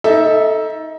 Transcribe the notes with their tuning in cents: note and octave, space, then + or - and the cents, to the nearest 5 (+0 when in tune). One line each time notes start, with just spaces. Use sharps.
D#4 +25 A4 +0 E5 +0